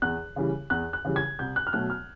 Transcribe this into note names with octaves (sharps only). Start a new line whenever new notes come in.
E2 F#6
C#3 E3 G3
E2 F#6
F#6
C#3 E3 G3
G#6
C2 G6
F#6
F6
B2 F#3 A3 F#6
F6